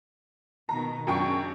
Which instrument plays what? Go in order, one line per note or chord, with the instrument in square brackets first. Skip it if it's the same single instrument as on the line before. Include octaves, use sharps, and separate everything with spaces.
[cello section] B2 D#3 [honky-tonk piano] A#5
[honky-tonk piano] F#2 G5 C#6 [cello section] C#3 D4